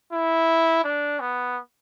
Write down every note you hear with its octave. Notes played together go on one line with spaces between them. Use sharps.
E4
D4
B3